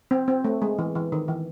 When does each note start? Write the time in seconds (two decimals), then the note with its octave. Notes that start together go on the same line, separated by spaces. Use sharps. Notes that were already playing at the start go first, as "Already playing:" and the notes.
0.11 C4
0.28 C4
0.44 A3
0.62 G#3
0.79 E3
0.95 E3
1.12 D#3
1.28 E3